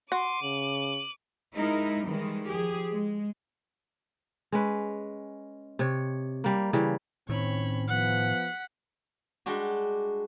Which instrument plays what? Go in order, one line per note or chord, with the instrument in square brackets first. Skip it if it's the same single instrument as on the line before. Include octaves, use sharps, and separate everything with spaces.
[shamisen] F#4 [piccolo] C6 [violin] D6 D#7
[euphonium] C#3 [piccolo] F#7
[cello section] G#3 D#4 E4 A#4
D#3 E3 G3 G#3
F3 G4 G#4
G#3
[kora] G#3 C#4 B4
C3 C#5
G3 A#3
C#3 E3 G3
[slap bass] A2 D#3 [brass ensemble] C4 C#4 [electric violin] C#5 B5
[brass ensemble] F3 B3 [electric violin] F#5 B6
[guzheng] G3 G#3 D4 F#4